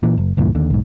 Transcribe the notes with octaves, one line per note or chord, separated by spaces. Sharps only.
A#2 E3
F#1
C#2 G2 A#2 E3
D#2 D3
B1 G#2